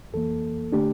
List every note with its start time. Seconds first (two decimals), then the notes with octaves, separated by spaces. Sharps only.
0.13 F2 E3 A#3 A4
0.72 D3 A3 D4 G4